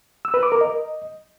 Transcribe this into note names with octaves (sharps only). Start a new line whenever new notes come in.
E6
B4
D6
A#4
D#5